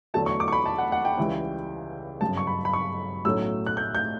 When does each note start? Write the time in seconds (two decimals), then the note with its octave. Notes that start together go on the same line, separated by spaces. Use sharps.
0.14 E2 D3 F#3 A3 A5
0.26 C#6
0.40 D6
0.48 C#6
0.52 B5
0.66 A5
0.78 F#5
0.92 F#5
1.05 G5
1.18 C#2 C#3 E3 G3
2.21 G1 F#2 C#3 A5
2.37 C#6
2.47 B5
2.65 B5
2.73 C#6
3.25 B1 A2 F#3 A3 C#4 E6
3.66 F#6
3.77 G6
3.95 G6